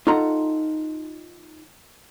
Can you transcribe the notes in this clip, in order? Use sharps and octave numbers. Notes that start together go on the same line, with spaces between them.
D#4 F4 A4 F#5 A#5